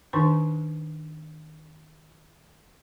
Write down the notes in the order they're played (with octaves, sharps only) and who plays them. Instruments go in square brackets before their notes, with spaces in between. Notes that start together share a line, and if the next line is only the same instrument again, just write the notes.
[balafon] D#3 D4 D#4 C5 C#6